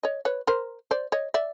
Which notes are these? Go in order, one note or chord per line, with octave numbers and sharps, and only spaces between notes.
C#5 D#5
B4 C#5
A#4 C5
C5 D5
C#5 D#5
D5 E5